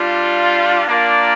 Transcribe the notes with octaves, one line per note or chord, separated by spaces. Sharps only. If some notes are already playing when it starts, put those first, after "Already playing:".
Already playing: G3 D4 F4
A#3 D4 F4 A#4 D5